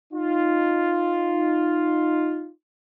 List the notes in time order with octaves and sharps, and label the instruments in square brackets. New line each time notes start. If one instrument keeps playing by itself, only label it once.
[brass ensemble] D#4 F4